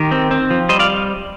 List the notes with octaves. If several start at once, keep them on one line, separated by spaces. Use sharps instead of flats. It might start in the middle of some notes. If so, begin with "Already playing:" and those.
Already playing: D#3 G4 A#4
C4
C4
F3
G3 C5 D#5
D5 F5